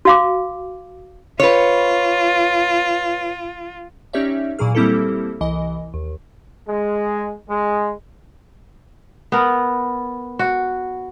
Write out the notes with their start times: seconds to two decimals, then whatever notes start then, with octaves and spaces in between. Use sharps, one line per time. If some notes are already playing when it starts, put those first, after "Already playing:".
0.05 F#4 F5 D6
1.40 F4 B4 C#5
4.13 C#4 D#4 G4 C#5 D5 E5
4.59 A#2 E3 F#3 G#4 F6
4.75 G3 A#3 C4 E4 G4 A4
5.41 C2 E3 D#5
5.94 D#2
6.68 G#3
7.49 G#3
9.32 B3 A#4
10.39 F#4